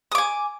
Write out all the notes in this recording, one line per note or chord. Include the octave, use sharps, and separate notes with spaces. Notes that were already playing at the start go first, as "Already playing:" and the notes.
G#5 D6 D#6